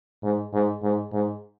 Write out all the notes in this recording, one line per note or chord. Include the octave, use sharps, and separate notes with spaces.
G#2
G#2
G#2
G#2